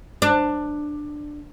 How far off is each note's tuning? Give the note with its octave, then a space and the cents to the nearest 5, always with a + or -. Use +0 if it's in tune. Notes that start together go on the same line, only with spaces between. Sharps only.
D4 +15